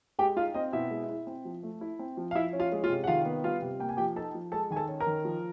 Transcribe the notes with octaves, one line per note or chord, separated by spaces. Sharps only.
G#3 G4 G5
D#4 F4 F5
C4 D#5
B2 E4 E5
G#3
E4
C4
F3
A3
E4
C4
F3
F5
F3 E4 E5
C#4
F4 F5
G#3
F4 F5
C3
F#5
D#3 F4 F5
B3
G3 F4 F5
C3
A#3 G5
G#5
F3 G4 G5
D#4 A4 A5
F3
G#3 A4 A5
D#3 G#5
A4 A5
C#4
A#4 A#5
D#3
F3